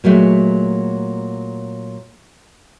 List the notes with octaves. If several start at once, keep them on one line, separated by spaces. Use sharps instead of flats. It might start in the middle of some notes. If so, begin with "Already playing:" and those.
A#2 F#3 G#3 A3